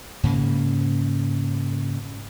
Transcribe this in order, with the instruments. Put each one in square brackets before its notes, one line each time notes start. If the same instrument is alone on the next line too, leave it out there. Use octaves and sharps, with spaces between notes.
[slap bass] G#2 C#3 A#3